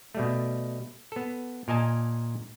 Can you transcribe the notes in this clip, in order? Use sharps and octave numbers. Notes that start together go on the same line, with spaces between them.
B2 G3 A3
B3 A4
A#2 A#4 D#5 G#5 A5